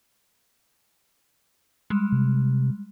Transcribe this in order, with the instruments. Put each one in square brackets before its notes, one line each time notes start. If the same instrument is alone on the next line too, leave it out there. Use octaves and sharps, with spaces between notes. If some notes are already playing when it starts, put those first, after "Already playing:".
[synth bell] G3 G#3
[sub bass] C3